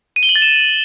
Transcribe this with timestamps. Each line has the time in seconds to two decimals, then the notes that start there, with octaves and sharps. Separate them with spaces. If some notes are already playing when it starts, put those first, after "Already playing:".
0.16 D#7
0.23 G7
0.29 F#7
0.36 A6
0.42 E7